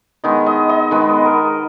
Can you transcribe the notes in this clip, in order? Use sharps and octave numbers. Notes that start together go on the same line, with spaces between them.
D#3 G#3 B3 D#5
D#5
D#5
D#3 G#3 B3 B4
A#4